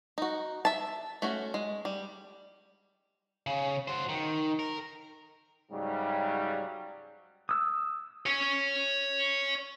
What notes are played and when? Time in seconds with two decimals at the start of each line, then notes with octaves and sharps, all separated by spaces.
0.18 D#4 F#4
0.65 E5 A5
1.22 A3 C#4 F#4
1.54 G#3
1.85 G3
3.46 C#3
3.88 F#4 C5
4.09 D#3
4.59 A#4
5.72 G#2 C#3 F#3 G3
7.49 D#6 E6
8.26 C#5 G#5